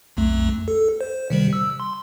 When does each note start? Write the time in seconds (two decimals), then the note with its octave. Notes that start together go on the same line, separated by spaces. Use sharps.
0.17 B1 F2 A3
0.68 A4
1.01 C5
1.30 C3 D#3 G3
1.53 E6
1.80 C6